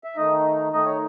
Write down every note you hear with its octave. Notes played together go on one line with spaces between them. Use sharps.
E5
D#3 A3 D#4 D#5
D#3 A3 D#4 D#5
C#5